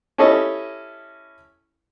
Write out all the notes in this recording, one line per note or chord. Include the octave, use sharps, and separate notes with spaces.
C#4 E4 G4 A4 D#5